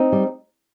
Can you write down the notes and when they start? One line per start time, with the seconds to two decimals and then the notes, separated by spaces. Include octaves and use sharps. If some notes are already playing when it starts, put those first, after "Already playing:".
Already playing: C4 D#4
0.12 G3